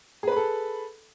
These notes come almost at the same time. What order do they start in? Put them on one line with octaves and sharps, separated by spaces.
G#4 B4 B5 A4